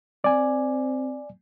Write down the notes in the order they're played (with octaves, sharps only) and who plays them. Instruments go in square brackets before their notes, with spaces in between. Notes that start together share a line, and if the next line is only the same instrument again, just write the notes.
[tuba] C4 [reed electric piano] D5 G#5